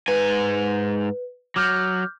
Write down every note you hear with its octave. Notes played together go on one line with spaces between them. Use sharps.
G#2 B4 G#5
F#3 D6 F6 G6